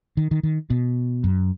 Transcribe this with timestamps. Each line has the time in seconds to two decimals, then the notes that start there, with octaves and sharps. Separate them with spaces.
0.17 D#3
0.31 D#3
0.43 D#3
0.70 B2
1.24 F#2